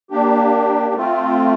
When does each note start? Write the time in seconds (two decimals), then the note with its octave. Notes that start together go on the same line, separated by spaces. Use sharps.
0.10 A#3 D4 G4
0.94 A3 C4 F4